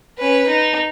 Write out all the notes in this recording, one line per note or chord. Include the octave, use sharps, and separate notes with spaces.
C#4 B4
D#4